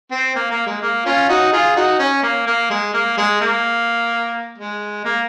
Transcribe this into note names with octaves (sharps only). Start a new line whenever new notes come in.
C4
A#3
A#3
G#3
A#3
C#4 F4
D#4 F#4
F4 G#4
D#4 F#4
C#4
A#3
A#3
G#3
A#3
G#3
A#3
G#3
A#3